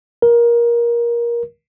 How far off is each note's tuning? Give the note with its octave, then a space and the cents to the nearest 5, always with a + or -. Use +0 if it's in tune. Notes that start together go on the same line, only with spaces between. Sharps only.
A#4 +20